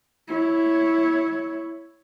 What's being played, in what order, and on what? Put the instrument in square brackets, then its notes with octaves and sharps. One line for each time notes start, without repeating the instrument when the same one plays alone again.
[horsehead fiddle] E4 C#5